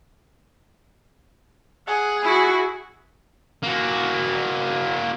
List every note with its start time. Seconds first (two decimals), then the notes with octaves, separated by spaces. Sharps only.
1.87 G#4 F#5
2.23 E4 F#4
3.63 A#3 F#4